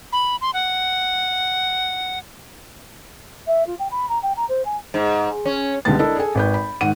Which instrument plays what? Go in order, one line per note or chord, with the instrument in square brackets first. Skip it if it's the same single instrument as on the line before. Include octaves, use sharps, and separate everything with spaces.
[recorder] B5
C6
F#5
[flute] E5
F4
G5
B5
A#5
G5
A#5
C5
G#5
[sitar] G#2
C#4
[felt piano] C#2 D3 G3 G#3 B3 A6
D4 E4 A4 A#4 D5 D#5
G#4 A4 G#5
G#1 B4 G6
B5
G#2 D#3 F#5 D#7